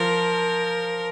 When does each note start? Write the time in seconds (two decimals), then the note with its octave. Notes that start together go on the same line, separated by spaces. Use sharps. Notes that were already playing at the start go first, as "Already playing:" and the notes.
Already playing: F3 A#4